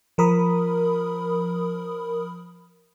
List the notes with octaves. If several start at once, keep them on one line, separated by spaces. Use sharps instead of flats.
F3 A#4 B5 D#6